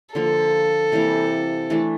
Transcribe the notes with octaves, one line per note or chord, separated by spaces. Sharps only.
D3 F3 A#3 A4
C3 E3 G3 A#3
E3 A3 D4